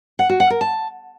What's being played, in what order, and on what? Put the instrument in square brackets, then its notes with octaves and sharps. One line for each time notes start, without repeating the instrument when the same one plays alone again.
[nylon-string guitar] F#5
F#4
F#5
A#4
A5